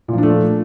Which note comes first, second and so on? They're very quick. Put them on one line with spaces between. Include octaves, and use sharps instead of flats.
A#2 F3 D4 A3